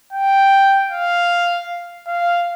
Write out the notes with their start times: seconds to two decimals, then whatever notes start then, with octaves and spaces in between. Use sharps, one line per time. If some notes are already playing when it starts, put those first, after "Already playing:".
0.13 G5
0.91 F5
2.07 F5